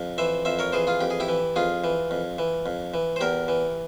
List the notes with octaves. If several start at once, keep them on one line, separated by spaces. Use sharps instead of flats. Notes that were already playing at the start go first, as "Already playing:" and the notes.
Already playing: F2
E3 C5 E5
F2 C5 E5
A#4 C#5
E3 G#4 C5
F4 G#4
F2 G4
G#4
E4 G4
E3
F2 F4 G#4
E3
F2
E3
F2
E3
C5
E2 G4 A#4
E3